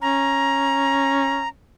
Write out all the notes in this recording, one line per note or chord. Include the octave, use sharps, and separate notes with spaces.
C#4 A#5